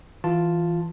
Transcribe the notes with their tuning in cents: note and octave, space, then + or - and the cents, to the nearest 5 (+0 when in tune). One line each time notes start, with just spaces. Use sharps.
E3 +0 F4 +0 A5 +0